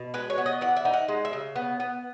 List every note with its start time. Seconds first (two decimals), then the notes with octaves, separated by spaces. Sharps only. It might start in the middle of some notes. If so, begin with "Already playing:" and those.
Already playing: B2
0.14 G#3 B4
0.30 C#5
0.38 B3
0.46 D#5
0.61 E3 F#5
0.77 E5
0.85 D#4
0.93 F#5
1.08 G#3
1.25 E5
1.33 C#3
1.56 B3
1.80 B3